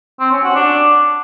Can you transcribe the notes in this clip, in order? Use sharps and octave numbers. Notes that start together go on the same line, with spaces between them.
C4
C#4
F#4
D4